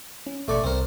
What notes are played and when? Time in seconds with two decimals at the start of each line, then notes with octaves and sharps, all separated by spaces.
0.27 C#4
0.48 G#1 B2 A3 D5 C#6
0.64 C2 C4 A#4